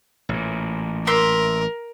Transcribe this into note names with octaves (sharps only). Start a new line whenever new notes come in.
A1 A#2
A#4 E5 C6 D6